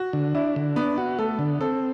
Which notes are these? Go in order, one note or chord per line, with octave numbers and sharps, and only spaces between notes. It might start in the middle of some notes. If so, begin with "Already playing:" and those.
Already playing: F#4
D3
D4 E4
D3
B3 D4
F#4
A3 A4
D3
C4 A4